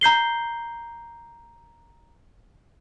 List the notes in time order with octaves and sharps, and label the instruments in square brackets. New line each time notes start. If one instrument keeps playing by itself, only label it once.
[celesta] A#5 G6 C7 G7